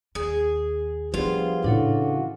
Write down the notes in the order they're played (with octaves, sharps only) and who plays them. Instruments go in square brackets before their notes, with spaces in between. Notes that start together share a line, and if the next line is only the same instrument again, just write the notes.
[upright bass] D#2 [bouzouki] G#4
[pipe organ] F3 G3 B3 [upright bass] D4 [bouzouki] F4 [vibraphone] G#4 C5
[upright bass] A2 [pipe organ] C#3 E3 F#4 [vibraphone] D4 A4 C#5